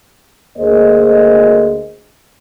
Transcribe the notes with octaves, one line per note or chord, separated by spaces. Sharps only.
D2 A#3 G#4 C5 D#5